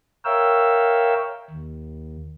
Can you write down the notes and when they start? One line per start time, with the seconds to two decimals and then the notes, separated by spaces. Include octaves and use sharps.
0.25 A#4 C#5 E5 F5 G5 E6
1.51 D#2